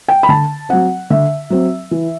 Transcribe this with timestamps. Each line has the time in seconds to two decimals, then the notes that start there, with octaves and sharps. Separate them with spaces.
0.08 G5
0.23 B5
0.29 D3 A5
0.69 F#3 C4 F#5
1.10 D3 E5
1.50 F#3 C4
1.91 E3